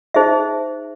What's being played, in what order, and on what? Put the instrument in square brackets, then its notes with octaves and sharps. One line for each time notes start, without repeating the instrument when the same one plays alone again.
[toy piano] D#4 G#4 C5 E5